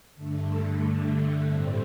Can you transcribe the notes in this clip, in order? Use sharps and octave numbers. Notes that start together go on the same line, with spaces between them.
G2 D3 A3
A2 G3 C4